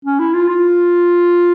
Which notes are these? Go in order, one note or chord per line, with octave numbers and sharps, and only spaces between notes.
C#4
E4
F4
F4